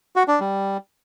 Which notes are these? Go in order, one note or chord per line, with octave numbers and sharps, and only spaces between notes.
F#4
D4
G3